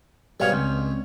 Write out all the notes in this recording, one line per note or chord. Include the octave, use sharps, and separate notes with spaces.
G#2 B2 G3 G#4 C#5 F5
C#2 G#3 C4 C#4